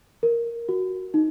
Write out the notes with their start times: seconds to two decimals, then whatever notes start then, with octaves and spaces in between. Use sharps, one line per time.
0.23 A#4
0.69 F#4
1.14 D#4